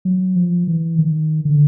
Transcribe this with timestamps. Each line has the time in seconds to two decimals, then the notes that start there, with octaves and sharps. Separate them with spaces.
0.05 F#3
0.36 F3
0.67 E3
0.99 D#3
1.45 D3